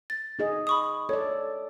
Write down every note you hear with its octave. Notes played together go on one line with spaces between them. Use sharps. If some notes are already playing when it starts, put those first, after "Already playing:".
A6
D#4 G#4 D#5
B5 C#6 D#6
A4 C#5 D5